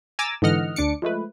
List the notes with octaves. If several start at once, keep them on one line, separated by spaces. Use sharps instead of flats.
G#5 A#5 D6 E6 A6
G#2 D3 E3 D#5 F#5 F6
D2 D4 D6 C#7
F3 G#3 A3 B4